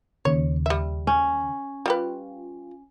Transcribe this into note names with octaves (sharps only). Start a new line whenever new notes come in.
D#2 C#3 C#5
G3 E5
C#4
G3 F4 G4 B4